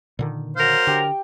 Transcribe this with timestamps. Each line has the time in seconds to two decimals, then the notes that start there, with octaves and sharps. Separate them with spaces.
0.19 A#2 D3 D#3
0.57 F#3 A#4 C5 F5
0.87 D3 G4